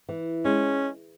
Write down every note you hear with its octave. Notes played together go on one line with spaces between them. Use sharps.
E3
G#3 C#4